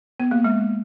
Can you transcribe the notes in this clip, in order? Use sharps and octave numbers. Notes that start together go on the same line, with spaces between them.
B3
A#3
G#3